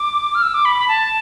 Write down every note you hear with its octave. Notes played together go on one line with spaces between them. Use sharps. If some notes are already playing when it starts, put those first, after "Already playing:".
Already playing: D6
F6
E6
D6
B5
B5
A5